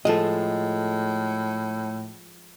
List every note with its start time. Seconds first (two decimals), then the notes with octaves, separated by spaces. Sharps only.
0.05 A2 F3 G#3 A4 D#5